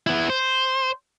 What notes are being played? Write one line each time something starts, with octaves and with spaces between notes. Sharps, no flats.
B3 E4
C5